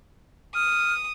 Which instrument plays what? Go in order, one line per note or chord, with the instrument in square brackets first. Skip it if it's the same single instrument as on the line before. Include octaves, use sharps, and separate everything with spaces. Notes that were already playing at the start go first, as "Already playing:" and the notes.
[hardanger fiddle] D#6 [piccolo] F6